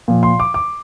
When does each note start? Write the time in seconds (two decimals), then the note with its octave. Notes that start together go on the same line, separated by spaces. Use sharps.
0.08 A#2 F3
0.23 C6
0.40 D6
0.54 D6